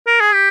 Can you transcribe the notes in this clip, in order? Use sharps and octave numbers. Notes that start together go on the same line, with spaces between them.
A#4
G#4
G4